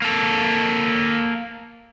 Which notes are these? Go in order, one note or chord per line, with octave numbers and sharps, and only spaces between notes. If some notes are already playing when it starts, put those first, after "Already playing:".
A#3 A4